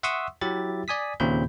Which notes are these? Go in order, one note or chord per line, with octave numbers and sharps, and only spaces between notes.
E5 F#5 C6 C#6 D#6 E6
F#3 E4 G4 E5 A6
D5 G#5 D#6 B6
D#2 A#2 C#3 C4 B5 G6